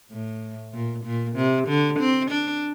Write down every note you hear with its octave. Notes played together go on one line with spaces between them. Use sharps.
A2
A#2
A#2
C3
D3
C4
D4